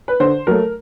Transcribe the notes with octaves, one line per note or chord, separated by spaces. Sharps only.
B4
D3 C5
F#3 A3 A#4